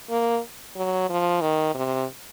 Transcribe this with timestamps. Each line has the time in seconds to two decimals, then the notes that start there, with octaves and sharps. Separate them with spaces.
0.10 A#3
0.76 F#3
1.10 F3
1.42 D#3
1.75 C3